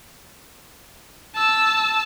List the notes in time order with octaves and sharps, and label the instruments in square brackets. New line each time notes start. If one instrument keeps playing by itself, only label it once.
[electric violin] A5 E6